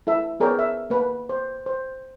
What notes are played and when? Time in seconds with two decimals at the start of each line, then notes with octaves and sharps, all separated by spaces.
0.07 E4 A4 E5
0.40 B3 G#4 A#4 C#5 D5 G5
0.59 E5
0.90 A#3 B4
1.29 C5
1.66 C5